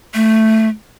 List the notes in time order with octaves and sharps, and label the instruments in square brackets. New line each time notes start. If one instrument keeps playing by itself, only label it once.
[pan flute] A3